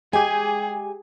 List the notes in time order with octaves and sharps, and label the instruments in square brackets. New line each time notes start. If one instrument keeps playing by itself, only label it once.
[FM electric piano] G#3 G4 [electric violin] G#4 [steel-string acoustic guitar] G#5